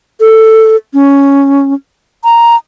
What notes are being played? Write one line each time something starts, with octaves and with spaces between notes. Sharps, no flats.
A4
C#4
A#5